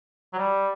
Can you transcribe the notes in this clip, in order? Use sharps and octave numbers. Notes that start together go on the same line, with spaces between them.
F#3
G3